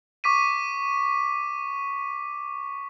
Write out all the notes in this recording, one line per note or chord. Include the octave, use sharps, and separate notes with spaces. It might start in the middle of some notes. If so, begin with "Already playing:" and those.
C#6 D6 B6 D#7